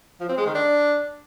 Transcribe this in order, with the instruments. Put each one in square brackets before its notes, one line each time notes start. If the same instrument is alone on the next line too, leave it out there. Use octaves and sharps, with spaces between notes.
[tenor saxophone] F3
C4
G#3
D#3
D4